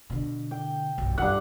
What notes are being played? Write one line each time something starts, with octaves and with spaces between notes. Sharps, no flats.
B2 D3
G5
B1 G2
G2 F4 F#5